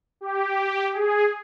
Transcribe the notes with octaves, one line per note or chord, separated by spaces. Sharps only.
G4
G#4